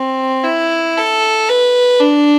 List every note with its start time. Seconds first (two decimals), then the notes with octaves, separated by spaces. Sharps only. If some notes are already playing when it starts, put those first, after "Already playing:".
Already playing: C4
0.44 E4
0.98 A4
1.49 B4
2.01 D4